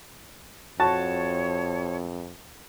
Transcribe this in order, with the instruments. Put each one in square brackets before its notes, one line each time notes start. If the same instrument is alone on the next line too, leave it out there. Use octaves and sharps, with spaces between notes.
[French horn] F2 [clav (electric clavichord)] F#4 [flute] C#5 [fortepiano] A5